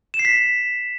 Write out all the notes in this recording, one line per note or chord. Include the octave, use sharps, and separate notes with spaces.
E7
C7
B6